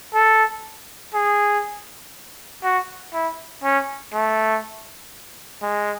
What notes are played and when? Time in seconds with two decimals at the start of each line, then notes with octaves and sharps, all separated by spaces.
0.14 A4
1.14 G#4
2.63 F#4
3.13 E4
3.63 C#4
4.13 A3
5.62 G#3